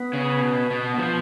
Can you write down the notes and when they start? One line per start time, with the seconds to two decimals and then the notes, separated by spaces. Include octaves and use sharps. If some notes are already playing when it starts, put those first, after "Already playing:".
Already playing: B3
0.13 C#3
0.42 B2
0.70 B2
0.98 F3 B3